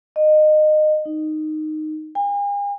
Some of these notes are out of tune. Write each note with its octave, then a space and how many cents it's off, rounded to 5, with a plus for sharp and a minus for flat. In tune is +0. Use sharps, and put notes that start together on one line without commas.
D#5 -25
D#4 -10
G#5 -45